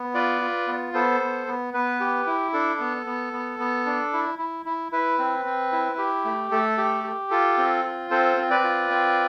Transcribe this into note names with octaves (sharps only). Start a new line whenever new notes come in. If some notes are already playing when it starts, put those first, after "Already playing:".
Already playing: B3
F4 B4 D5
F4
B3
B3 A4 C5
B3
B3
B3 B4
G4
E4
D4 A4
B3
B3
B3
B3
D4
E4
E4
E4
E4 B4
C4
C4
E4
G4
A3
A3 A4
G4
G4
F4 A4
C4
F4
C4 A4 C5
C4
B4 D5
F4
C4